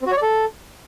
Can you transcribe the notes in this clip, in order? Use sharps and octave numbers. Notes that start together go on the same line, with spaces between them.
C4
F#4
C#5
D5
A4